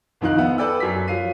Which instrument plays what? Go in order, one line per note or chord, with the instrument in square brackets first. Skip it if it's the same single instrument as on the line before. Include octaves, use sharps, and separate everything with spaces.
[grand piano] C2 F2 D#3 D#4 F5 F#6
B3 E5 F#5
A4 B4 D5 G5 E6
F#2 B6
F3 F#3 F5 C7 D#7